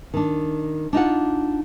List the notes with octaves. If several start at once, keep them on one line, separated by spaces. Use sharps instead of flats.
D#3 D4
D4 D#4 F4 F#5